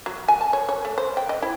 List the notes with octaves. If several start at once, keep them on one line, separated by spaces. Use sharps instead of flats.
F#3
G#5
A5
C#5
C#5
A3
C5
G5
D#5
E4